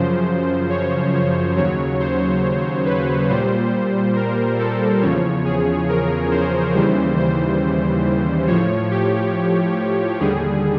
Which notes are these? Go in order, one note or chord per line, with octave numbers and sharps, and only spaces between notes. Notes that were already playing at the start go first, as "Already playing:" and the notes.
Already playing: F#2 C#3 F3 C5
C#5
C#5
D#2 C#3 F#3 C#5
C5
B4
A#2 G3 C5
A#4
A4
E2 C#3 F3 C#5
G#4
A#4
C5
D#2 C#3 E3 G3 C5
C5
A2 F3 C#5
G4
D#2 D3 G3 G#4